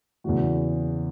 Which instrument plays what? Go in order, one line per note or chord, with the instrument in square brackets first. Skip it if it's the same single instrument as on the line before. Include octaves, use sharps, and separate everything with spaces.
[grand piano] E2 C#3 E3 F#4